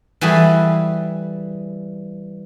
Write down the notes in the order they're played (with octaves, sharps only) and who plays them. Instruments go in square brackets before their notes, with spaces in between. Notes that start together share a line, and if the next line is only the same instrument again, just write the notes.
[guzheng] E3 G3 F#4 G#4 A4 B4